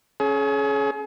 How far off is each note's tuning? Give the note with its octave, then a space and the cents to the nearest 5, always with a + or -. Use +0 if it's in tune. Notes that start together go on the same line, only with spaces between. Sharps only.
C#4 +0 G#4 +35